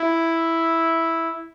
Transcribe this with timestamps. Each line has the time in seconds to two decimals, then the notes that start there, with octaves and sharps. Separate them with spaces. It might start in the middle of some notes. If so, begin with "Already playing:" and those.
Already playing: E4